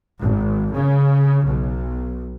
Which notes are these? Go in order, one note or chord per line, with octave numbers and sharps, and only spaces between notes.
G#1
C#3
B1